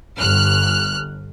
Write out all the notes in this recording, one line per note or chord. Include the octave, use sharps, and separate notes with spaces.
G1 F6 F#6